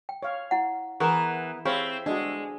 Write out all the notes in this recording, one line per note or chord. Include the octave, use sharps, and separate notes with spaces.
G5
C#5 F5
E4 F#5
E3 B3 G#4 A#4 F#5 A#5
C4 G4 G#4 C#5 E5 F5 B5
G#3 D4 F#4